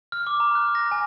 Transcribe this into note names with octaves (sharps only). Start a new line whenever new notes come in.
F6
D6
A#5
F#6
A#6
G#5